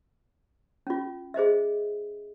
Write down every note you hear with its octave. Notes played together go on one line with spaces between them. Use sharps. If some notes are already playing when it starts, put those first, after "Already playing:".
C#4 F4
G#4 C5 D#5 E5